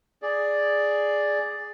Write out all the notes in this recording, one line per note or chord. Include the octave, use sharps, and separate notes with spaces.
G#4 D5